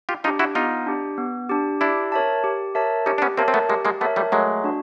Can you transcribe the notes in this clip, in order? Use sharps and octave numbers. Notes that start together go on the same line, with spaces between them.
F4 G4
D4 D#4 F4 G4
E4 F#4
B3 D#4 F4
D4 G4
B3
D4 G4
D4 E4 G4
A#4 C#5 E5 A5
G4
A#4 C#5 E5 A5
C#4 D#4 G4
D4
B3 C#4
A#3 C4 A#4 C#5 E5 A5
C4
A3 B3
G#3 A#3 G4
G#3 A#3
A3 B3 A#4 C#5 E5 A5
G3 A3
F#3 G#3 A3
D4 F#4